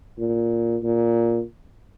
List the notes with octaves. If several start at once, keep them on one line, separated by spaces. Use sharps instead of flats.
A#2
A#2